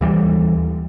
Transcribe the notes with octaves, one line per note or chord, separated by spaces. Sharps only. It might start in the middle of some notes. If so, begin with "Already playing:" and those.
D#2 E3 G3